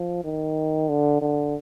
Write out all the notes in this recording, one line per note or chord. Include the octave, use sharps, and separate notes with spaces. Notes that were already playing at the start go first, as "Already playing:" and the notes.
Already playing: F3
D#3
D3
D3